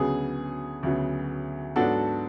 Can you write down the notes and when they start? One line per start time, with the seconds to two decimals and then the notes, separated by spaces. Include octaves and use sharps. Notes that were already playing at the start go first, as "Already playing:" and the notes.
Already playing: D2 C#3 F#3 B3 G#4
0.83 D2 C#3 F#3 B3
1.76 G#2 F#3 B3 D4 F#4 A4